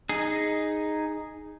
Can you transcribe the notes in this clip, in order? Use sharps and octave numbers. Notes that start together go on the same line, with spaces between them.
D#4 G#4